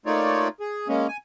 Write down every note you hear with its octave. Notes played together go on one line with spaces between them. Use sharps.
A3 A#3 D#4 F4 C#5 D5
G#4
G#3 A#3 C#4
G#5